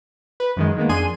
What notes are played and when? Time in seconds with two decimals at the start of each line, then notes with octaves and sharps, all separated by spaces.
0.40 B4
0.56 F#2 D#3 G#3
0.77 D#3 G#3 A#3 B3
0.89 F2 D4 G#4 G#5 C6 D#7